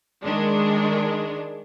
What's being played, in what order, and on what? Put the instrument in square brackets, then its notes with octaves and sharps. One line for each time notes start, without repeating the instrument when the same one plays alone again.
[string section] D#3 G#3 D4